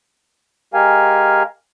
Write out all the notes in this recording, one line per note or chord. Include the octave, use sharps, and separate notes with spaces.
G#3 G4 A#4 F5 G#5